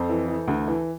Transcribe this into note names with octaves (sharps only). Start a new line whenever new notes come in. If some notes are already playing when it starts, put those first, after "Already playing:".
Already playing: F2 A4 C5
E3
E3
D2
E3